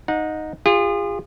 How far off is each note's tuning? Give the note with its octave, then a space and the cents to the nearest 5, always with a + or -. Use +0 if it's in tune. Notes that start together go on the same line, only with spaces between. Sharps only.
D#4 -5 F#5 -30
F4 +0 G#4 -40